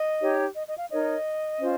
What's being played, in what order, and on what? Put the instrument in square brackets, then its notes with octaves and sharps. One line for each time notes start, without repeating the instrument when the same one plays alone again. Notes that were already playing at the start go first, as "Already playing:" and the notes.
Already playing: [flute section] D#5
D#4 G4 C#5
D#5
D#5
F5
D#4 A#4 C#5 D#5
C#4 F4 C5